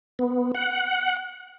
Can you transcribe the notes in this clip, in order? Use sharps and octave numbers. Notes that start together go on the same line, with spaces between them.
B3
F#5